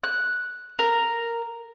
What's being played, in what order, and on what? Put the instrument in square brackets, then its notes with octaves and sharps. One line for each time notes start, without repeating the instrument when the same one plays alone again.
[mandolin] F#6
A#4